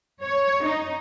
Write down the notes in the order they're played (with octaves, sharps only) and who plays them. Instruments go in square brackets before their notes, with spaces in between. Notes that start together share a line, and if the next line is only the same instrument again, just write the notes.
[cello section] C#5
D#4